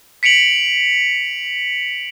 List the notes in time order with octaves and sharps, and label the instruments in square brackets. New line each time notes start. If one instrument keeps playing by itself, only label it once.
[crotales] B6 C#7 D7 F7 F#7